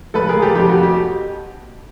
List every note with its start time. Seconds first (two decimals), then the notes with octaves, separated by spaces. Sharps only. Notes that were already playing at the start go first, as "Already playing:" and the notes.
0.14 F1 A4 B4
0.29 G#4 A#4
0.35 F1
0.42 G4 A4
0.56 F2 G4
0.69 F#4
0.83 G4